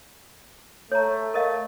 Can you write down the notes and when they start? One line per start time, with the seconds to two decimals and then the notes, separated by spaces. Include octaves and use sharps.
0.92 A3 C#5 A#5
1.34 A#4 D#5 F5